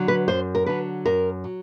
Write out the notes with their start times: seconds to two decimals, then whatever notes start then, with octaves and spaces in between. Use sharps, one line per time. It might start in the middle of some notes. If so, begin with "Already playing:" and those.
Already playing: D3 F#3
0.08 B4
0.28 F#2 C5
0.55 A#4
0.66 D3 F#3 B4
1.06 F#2 A#4
1.44 F#3